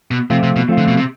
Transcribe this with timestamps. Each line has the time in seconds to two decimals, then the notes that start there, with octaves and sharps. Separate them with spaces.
0.11 B2
0.30 C3 F3 A3 C4 F4
0.43 C3
0.56 B2
0.69 F3 A3 C4 F4
0.78 D3
0.88 B2
0.97 C3